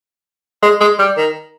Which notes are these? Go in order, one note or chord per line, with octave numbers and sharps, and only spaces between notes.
G#3
G#3
G3
D#3